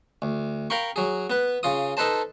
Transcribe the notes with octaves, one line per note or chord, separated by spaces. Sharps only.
D2
A#4 F5 G5 B5 C#6
F#3 G#4
B3 B4
C#3 F4 D#6
D#4 A4 B4 C5 A5